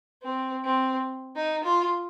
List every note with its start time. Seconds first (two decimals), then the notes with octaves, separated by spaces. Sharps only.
0.22 C4
0.65 C4
1.36 D#4
1.64 F4